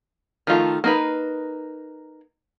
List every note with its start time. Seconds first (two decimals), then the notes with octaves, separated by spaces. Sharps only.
0.47 D#3 F3 A3 F4
0.84 A#3 D#4 B4